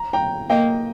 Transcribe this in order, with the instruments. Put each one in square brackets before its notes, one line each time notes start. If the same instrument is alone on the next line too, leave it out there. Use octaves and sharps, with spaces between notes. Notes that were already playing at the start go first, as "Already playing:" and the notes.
Already playing: [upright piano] A#5
G5 A#5
[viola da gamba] A#3 [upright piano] D#5 G5